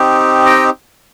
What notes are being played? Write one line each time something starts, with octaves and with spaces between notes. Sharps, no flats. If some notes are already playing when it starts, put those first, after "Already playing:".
Already playing: C4 D#4 G4
D#5 G5